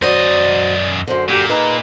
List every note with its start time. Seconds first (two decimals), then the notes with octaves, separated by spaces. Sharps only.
0.02 F#2 F#3 C5 D5 D#5
1.07 F#2 D3 C5
1.29 A#2 G4
1.49 D#4 G#4 B4 A#5